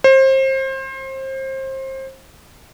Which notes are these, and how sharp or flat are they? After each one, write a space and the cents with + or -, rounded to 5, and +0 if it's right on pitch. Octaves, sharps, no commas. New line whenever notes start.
C5 +30